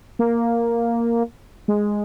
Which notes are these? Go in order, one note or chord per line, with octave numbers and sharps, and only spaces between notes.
A#3
G#3